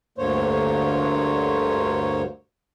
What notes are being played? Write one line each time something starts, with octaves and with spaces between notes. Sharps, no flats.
D2 G2 D3 A#3 C5 C#5